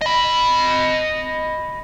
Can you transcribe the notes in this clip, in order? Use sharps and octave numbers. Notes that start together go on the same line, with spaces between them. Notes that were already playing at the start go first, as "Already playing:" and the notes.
D#5 B5